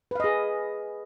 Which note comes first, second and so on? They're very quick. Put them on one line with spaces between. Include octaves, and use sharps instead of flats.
B4 F5 D#5 G#4